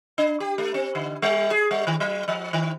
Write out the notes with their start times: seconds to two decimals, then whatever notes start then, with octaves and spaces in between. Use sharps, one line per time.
0.18 D4
0.40 G4
0.58 A3
0.74 C4
0.95 D3
1.22 G3
1.51 G#4
1.71 G3
1.87 D#3
2.00 F#3
2.28 F3
2.53 D#3